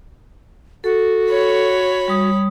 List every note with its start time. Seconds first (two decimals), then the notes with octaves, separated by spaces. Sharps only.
0.84 F#4 A4
1.30 C#5 B5
2.08 G3 D#6